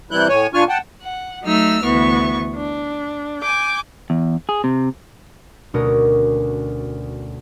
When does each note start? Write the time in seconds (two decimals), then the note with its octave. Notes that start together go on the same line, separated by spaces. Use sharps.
0.11 C3 E3 G3 E4 F#6 G6
0.29 A2 C#5 G#5
0.54 A#2 D4 F4 G#5 C#6 F6
0.69 F#5 G5 A5
1.03 F#5
1.42 F#3 A3 D#4 E6 F6
1.83 D2 E3 B3 C#6
2.56 D4
3.40 G#5 D6 G6
4.10 E2
4.49 G#4
4.64 C3
5.74 D2 B2 C#4 D4 A#4 D#6